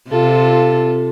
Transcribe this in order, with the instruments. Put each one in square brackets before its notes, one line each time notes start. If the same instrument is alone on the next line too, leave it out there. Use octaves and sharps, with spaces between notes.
[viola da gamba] C3 [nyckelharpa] F4 A4